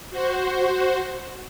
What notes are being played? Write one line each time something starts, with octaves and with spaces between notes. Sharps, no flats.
F#4 C5